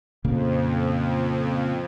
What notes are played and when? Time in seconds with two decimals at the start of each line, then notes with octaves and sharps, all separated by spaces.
0.24 F2 A#2 C#3 A#3